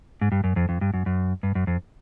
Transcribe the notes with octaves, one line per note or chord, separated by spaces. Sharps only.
G#2
G2
F#2
F2
F2
G2
F#2
F#2
G2
F#2
F2